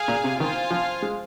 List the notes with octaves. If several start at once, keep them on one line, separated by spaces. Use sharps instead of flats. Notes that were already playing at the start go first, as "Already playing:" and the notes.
Already playing: G#4 F5 G#5
A#2
C3
D#3 F4 C5 F5 G#5
F3
G#3